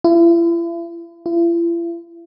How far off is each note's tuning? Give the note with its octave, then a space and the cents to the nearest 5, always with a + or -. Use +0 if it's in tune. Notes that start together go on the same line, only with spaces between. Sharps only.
E4 +40
E4 +45